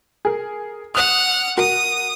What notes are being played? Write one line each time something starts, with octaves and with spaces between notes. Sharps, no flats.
G#4 A#4
F#5 D#6 F6 F#6 E7
F#4 A#4 D#6